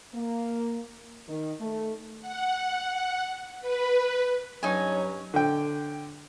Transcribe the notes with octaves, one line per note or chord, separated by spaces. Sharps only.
A#3
D#3
A3
F#5
B4
G2 F#3 C#4 D#4 C#5 G#5
D3 G5